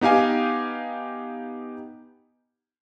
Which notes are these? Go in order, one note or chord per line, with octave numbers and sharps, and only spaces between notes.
B3 D#4 G4 F5 G#5